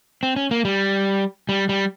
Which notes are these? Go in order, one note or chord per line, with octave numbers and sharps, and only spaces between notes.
C4
C#4
A#3
G3
G3
G3